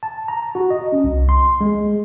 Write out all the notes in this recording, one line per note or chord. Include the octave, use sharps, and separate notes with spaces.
A5
A#5
F#4
D#5
C#4
C2
C6
G#3